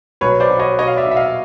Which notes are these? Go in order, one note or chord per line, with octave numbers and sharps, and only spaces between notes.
B1 B4 C#5
C5 D5
B2
C#5 D#5
B2 C#5 D#5
F5
D5 E5
B2 E5
D#5 F5